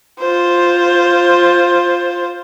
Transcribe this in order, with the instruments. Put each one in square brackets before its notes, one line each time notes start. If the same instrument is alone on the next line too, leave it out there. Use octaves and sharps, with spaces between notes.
[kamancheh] F4 C5